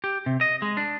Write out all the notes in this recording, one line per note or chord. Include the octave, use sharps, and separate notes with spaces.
G4
C3
D#5
G#3
D4